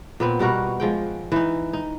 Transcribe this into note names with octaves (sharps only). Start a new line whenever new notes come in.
A#2 B3 C4
B2 G3 F#4 A#4
F3 G#3 G5
E3 D#4
D#4